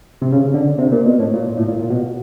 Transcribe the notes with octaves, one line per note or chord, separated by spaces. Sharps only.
C3
C#3
D3
C3
A#2
B2
A2
A#2
A#2
A2
A#2
A#2
B2